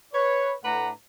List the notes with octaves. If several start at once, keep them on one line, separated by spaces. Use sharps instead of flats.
B4 C#5
A2 A3 D4 B4 F#5 A#5